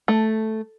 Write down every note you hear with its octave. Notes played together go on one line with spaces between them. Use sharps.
A3